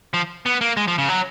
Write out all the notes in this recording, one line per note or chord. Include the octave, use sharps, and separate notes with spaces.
F3
B3
A#3
G#3
F3
C#3
F#3